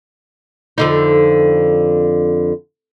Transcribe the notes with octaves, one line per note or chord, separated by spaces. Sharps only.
F2 D3 D#4